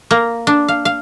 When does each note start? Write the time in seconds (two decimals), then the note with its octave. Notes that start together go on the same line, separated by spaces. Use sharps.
0.11 A#3
0.47 D4
0.68 F5
0.85 F5